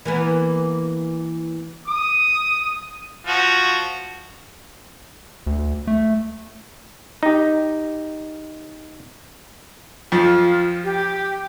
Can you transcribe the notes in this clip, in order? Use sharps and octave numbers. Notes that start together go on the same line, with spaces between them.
E3 A#3 B3
D#6
F3 F#4
D2
A3
D#4 G4
F2 F3 F4
G4